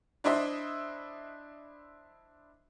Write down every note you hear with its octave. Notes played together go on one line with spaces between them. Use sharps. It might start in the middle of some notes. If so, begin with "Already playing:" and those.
D4 E4 C5 D#5 E5